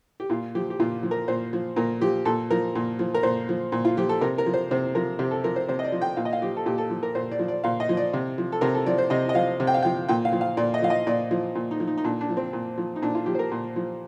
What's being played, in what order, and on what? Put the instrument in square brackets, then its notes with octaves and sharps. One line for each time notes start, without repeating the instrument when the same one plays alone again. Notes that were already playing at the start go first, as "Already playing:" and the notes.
[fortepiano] G4
A#2 F4
F3 G4
G4
A#2 F4
F3
A#4
A#2 C5
F3
A#2 A#4
F3 G4
A#2 A4
F3 A#4
A#2
F3
A#4
A#2 C5
F3
A#2
F4
F3 G4
A4
C3 A#4
A#4
F3
C5
C3 C5
F3 A#4
C3 G4
A4
F3 A#4
C5
C3 C5
D#5
D5
F3
G5
A#2 F5
D#5
F5
F3 G4
A4
A#2 G4
A4
F3
A#4
A#2 C5
D5
F3
D5
A#2 F5
D#5
F3
D5
C3
F3
A4
C3 A#4
A4
F3 D5
C5
C3 D#5
D#5
F3 F5
C3
G5
F5
F3 G5
A#2 G5
F5
F3
F5
A#2 D5
D#5
F3 F5
D#5
A#2 D5
F3
A#2
D#4
F3
D#4
D#4
A#2 D4
D4
F3
C4
A#2
F3
D#4
A#2 D4
F4
F3 G4
C5
A#4
A#2
F3